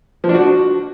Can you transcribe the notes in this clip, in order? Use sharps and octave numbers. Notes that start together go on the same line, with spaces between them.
F3
D4
F#4